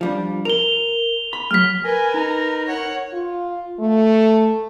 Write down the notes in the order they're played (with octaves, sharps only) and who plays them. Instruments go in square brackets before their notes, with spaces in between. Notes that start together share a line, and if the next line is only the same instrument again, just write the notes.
[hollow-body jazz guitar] F3 G3 D4
[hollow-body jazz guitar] A#4 [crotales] F7 G7
[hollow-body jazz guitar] B5
[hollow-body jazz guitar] F#3 G#3 [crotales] F6 B6
[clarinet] A#4 [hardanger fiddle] B4 [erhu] G#5
[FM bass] D#4 [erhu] A#5
[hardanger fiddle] C#5 [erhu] F#5
[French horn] F4
A3